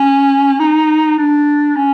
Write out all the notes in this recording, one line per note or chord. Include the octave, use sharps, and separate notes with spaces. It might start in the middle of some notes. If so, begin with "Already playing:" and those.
Already playing: C#4
D#4
D4
C#4